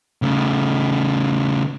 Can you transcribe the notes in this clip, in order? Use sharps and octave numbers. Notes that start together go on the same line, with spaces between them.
C#3 A3